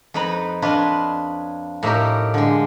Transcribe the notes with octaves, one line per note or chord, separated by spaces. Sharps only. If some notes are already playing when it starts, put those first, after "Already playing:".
F2 D#4 B4 A#5 B5
D4 F4 B4 C#5 D#5
A2 A#3 D#4 G4 A#4
D3 G#3